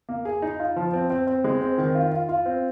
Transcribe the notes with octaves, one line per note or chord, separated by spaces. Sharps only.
A#3
G#4
D#4
F4
F3
C4
C4
C4
G#3
C4
D#3
F4
F4
F4
C4